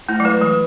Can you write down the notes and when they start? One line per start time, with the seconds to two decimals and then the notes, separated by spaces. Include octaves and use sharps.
0.09 A3 E4
0.20 F#3
0.25 G#3 B4
0.41 E3 B4